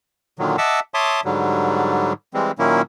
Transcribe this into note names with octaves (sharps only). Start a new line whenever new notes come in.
A#2 D3 D#3 F#3
D#5 E5 F#5 A5 D6 E6
C#5 E5 A5 C6 D6 D#6
G#2 D3 F#3 G3
E3 G3 G#3 C4
A#2 D#3 F#3 A#3 C#4 E4